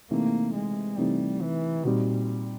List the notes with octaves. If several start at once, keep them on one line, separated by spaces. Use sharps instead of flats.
C3 E3 A3 A#3 C4 D#4
G#3
C3 E3 G3 A3 C4 D#4
E3
A#2 G3 C4 D#4 F#4